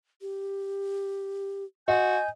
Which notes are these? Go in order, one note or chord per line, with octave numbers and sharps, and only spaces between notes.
G4
F#4 D#5 G#5 G6